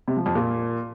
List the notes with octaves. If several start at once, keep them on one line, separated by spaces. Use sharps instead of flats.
C3
F3
F2
A#2